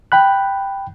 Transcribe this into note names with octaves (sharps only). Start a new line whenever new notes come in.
G5 B5 F#6